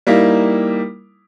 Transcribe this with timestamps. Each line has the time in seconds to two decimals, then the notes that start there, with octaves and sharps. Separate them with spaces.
0.07 G3 A#3 D#4 E4